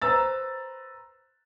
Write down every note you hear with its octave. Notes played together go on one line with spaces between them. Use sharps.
B4 C5 A#5 E6 A6